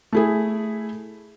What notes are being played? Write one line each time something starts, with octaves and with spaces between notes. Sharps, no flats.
A3 E4 G#4